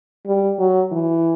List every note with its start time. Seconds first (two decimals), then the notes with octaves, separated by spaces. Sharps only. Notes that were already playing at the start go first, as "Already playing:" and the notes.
0.26 G3
0.59 F#3
0.92 E3